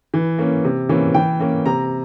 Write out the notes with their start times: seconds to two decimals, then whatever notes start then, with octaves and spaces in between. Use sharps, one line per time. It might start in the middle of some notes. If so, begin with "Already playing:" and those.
0.14 E3
0.39 A#3 C#4
0.65 C3
0.89 E3 A#3 C#4
1.14 E3 G5
1.40 A#3 C#4
1.66 C3 A#5